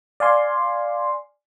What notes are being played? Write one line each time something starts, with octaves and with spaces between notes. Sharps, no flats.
D5 F5 G#5 C6